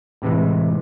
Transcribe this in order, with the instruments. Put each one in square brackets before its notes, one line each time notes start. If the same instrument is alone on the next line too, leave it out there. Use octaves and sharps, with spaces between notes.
[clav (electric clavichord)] A2 C3 E3 G#3